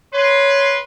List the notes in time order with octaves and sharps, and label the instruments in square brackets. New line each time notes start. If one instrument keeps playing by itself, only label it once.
[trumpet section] B4 C6 [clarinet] C#5